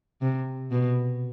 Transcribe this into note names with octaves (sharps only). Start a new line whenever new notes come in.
C3
B2